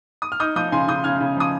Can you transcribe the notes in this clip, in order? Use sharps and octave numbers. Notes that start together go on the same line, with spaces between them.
D#6
F6
D#4 D#6 G6
F3 D#6 G6
C#3 G#5 C6
C#3 D#6 G6
C#3 F6 G#6
C#3
F3 D#6